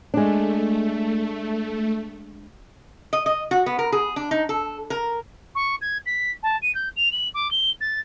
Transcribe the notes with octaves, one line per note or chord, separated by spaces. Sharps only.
G#3 A3 D4
D#5
D#5
F#4
B3
A#4
G#4
D4
D#4
A4
A#4
C#6
G#6
B6
A5
D#7
G6
F7
F#7
D6
G7
A6